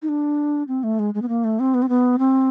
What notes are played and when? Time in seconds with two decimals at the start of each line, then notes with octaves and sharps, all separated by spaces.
0.02 D#4
0.09 D4
0.68 C4
0.83 A3
0.99 G#3
1.14 G#3
1.22 B3
1.29 A#3
1.44 A3
1.60 C4
1.74 B3
1.82 C4
1.89 B3
2.19 C4